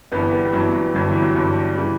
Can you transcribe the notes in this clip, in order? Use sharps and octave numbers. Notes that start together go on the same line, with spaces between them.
G1 G2 E3 G3 B3
G3 B3
G3
G1 G2 E3 F#3
F#3
G1 G2 D3 F#3
E3 G3
F#3
G1 G2 D3
C#3 E3 G3